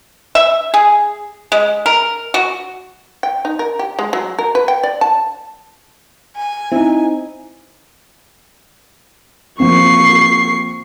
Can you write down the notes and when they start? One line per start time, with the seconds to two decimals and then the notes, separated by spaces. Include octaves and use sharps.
0.35 E5
0.74 G#4
1.52 G#3
1.86 A#4
2.34 F#4
3.23 G5
3.45 D#4
3.59 A#4
3.79 G4
3.99 G#3
4.13 F#3
4.39 A#4
4.55 B4
4.68 G5
4.83 D5
5.01 A5
6.36 G#5
6.72 C4 D#4 E4
9.60 F3 A#3 C4 C#6 C7